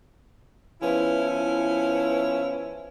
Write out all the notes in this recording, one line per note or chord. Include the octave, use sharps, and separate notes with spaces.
F3 B3 C#4 E4